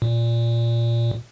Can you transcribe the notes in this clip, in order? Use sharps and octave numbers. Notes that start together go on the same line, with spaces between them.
A#2